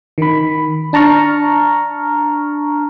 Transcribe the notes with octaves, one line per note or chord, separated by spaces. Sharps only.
D#3 B5
D4 A5 A#5 C#6 F6